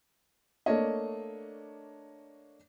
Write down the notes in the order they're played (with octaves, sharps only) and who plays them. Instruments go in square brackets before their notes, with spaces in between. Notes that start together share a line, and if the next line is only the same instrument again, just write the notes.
[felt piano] A3 A#3 D4 C#5 D#5